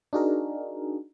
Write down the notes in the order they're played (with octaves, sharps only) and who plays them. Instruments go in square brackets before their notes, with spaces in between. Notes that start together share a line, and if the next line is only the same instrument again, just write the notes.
[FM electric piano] D4 D#4 F#4 G#4 A#4